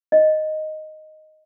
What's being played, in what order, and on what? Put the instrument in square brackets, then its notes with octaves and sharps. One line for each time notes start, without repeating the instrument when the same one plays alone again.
[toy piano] D#5